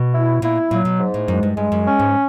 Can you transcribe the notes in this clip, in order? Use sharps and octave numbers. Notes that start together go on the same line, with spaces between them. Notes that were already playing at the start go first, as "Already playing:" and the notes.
Already playing: B2
E4
A#2 E4
A#2 F#3
B2
G#2
A2
F#2 G#3
G2
G2 G#3
F#2
C#4
G#2